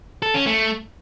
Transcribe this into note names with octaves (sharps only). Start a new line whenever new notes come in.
A4
C#4
A3